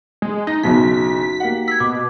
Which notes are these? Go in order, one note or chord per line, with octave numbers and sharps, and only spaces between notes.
G#3
D#4 A#6
F#1 B1 B2 D#4 F#4 B6
A#3 G4 F#5
E6 G#6 B6
B2 D6